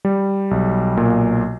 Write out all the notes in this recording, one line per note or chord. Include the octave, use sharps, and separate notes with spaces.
G3
B1
A#2